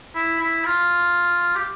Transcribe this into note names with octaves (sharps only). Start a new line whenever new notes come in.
E4
E4
F4
G4